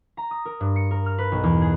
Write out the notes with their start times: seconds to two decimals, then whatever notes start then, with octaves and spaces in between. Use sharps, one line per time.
0.17 A#5
0.31 D#6
0.45 A#4
0.60 G2
0.76 C#7
0.91 A#4
1.06 F6
1.18 B4
1.32 B1
1.44 E2
1.61 G#4